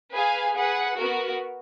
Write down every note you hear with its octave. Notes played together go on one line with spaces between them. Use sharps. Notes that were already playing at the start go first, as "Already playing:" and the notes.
G#4 B4 F5 G#5
G#4 B4 F#5
B3 F#4 A#4